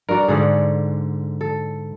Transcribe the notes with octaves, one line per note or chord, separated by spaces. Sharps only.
G2 F#4 A#4 D5
G#2 D3 G#4 D5 F#5
A4